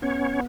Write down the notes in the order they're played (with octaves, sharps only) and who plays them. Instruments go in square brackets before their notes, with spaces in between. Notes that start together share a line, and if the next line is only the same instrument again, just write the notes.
[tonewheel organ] B3 C#4 C#5